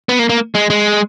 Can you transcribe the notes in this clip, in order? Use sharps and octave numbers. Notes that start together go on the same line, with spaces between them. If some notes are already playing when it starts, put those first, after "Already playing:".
B3
A#3
A#3
G#3
G#3